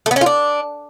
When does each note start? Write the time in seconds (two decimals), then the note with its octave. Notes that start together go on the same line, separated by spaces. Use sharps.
0.06 A3
0.11 B3
0.16 C#4
0.21 F4
0.26 D4